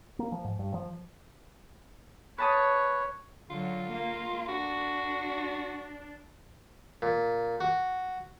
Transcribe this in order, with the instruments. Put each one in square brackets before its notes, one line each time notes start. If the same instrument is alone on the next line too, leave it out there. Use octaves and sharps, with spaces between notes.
[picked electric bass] A#3
F3
G#2
G2
F3
[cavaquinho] B4 A5 D#6 [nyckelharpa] C#5
[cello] D3 F#3 [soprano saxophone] F4
[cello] A#3
[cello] D4 [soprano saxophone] F#4
[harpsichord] A#2
F#4